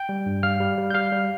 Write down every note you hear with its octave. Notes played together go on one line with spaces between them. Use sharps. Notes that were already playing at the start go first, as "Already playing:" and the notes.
Already playing: G5 G6
G3
G2
G3 F5 F6
G3
G3
G6
G3 F5 F6
G3